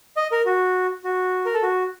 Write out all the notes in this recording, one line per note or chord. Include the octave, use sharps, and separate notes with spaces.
D#5
A#4
F#4
F#4
A#4
A4
F#4